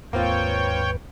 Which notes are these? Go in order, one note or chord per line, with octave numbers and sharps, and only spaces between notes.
D#2 G#2 A#3 C4 F4 B4 C#5 G5